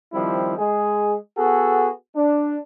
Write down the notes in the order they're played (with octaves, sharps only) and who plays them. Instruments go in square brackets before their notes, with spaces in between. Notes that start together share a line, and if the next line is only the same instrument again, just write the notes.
[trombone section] D#3 F3 G3 C4 E4
G#3 G#4
B3 F#4 G#4 A4
D4